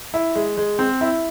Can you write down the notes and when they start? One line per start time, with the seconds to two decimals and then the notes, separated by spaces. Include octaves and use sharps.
0.14 E4
0.35 G#3
0.57 G#3
0.79 C4
1.01 E4